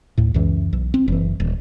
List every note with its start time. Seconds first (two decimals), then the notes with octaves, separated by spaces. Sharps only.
0.18 D2 A2
0.34 C#2 F#2 E3
0.73 B1
0.94 C4
1.08 F#1 C#3 E3
1.40 D#1